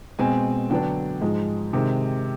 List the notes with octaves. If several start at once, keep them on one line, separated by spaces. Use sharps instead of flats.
B2 G#3 C4 G#5
D3 F#3 B3 D4 G5
G#2 F3 G#3
C3 D#3 G#3 C4